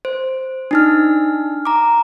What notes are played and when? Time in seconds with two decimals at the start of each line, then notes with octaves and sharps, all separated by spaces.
0.05 C5
0.71 D4 D#4 F6
1.65 A#5 D6